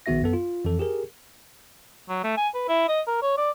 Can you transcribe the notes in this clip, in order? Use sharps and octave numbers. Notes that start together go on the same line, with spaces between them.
A#1 D#3 B3 F#4 E5 A#6
F#2 B3 A4
F4
F2 E3 A4
G4 G#4 A#4
F#3
A3
G#5
B4
E4
D#5
A#4
C#5
D5